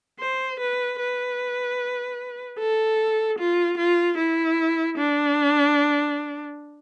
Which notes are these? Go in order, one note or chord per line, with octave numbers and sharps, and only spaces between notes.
C5
B4
B4
A4
F4
F4
E4
D4